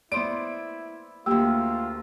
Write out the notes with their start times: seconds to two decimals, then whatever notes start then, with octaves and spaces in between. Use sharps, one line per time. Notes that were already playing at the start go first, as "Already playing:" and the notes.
0.12 B3 E4 C5 D5 D7
1.26 D2 A#3 F4 G4 E6